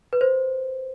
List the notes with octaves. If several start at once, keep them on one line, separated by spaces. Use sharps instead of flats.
B4
C5